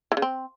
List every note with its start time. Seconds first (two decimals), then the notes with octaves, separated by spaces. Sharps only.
0.12 E3
0.17 C#3
0.22 C4